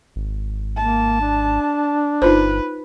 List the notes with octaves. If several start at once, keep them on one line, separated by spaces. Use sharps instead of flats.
G#1
A#3 A5
D4
G1 D#4 F4 B4 C5